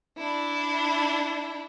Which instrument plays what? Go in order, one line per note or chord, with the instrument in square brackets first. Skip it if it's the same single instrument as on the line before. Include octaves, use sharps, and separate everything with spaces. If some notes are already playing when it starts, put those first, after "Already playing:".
[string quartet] D4 E4